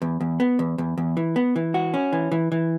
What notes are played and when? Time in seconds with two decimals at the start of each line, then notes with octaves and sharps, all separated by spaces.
0.02 E2
0.21 E2
0.40 B3
0.59 E2
0.78 E2
0.98 E2
1.17 E3
1.36 B3
1.56 E3
1.74 F#4
1.94 C#4
2.13 E3
2.32 E3
2.52 E3